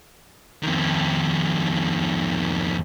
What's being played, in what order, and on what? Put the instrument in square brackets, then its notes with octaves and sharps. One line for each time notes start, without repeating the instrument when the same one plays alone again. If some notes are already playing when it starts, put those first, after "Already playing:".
[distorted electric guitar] F2 D#3